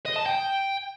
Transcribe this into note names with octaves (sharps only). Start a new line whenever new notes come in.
D#5
A5
G5